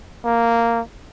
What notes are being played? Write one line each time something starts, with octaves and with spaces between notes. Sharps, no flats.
A#3